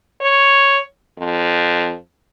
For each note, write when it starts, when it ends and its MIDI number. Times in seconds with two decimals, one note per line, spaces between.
0.21 0.80 73
1.18 1.94 41